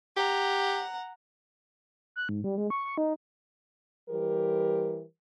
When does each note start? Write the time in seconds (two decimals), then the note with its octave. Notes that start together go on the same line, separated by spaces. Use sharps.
0.17 G4 F#5 A#5
2.16 F#6
2.29 G#2
2.44 G3
2.58 G#3
2.70 C#6
2.85 C#6
2.98 D#4
4.10 E3 G3 G4 A#4 C5